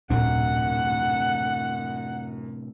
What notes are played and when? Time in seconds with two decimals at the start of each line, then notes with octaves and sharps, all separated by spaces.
0.10 D#1 F#2 A2 C3 D4 F#5